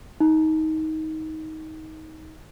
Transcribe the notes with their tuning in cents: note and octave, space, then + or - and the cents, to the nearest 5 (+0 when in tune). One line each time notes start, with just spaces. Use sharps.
D#4 +20